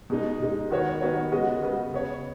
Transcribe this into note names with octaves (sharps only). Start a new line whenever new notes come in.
B2 G#3 D#4
B2 G#3 D#4
D#3 B3 F#4 C#5
D#3 B3 F#4 C#5
C#3 G#3 B3 F#4 D#5
C#3 G#3 B3 F#4 D#5
C#3 B3 G#4 C#5